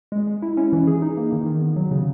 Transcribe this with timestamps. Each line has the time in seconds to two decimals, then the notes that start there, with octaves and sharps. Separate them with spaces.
0.12 G#3
0.27 G#3
0.42 E4
0.57 C#4
0.73 E3
0.87 G#4
1.02 D#4
1.17 A#3
1.32 D#3
1.46 D#3
1.61 B3
1.76 F#3
1.91 C#3